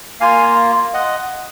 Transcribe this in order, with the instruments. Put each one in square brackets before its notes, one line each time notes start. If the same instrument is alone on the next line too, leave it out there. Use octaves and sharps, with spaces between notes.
[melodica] A#3 F4 F5 G#5
D#5 F#5